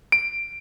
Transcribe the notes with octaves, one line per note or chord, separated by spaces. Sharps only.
D7